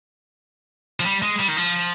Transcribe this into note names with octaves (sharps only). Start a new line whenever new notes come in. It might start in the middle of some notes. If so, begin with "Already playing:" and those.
F3
G3
G#3
G3
D#3
F3